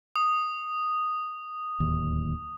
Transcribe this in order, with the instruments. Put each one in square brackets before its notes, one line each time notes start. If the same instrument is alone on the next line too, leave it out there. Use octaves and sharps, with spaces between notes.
[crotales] D#6
[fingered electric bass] D1 D#2